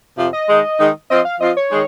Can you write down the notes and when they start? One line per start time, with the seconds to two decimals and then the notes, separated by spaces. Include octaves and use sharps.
0.18 F2 C3 F3
0.33 D#5
0.48 D#3 G#3 D#4
0.79 D#3 G#3 D#4
1.10 F3 C4 F4 D#5
1.25 F5
1.41 F3 C4 F4 D#5
1.57 C#5
1.71 D#3 G#3 D#4 G#4